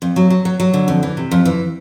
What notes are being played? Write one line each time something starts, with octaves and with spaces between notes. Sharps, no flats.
F2
F#3
F#3
F#3
F#3
D3
F2
E3
C3
F2
E3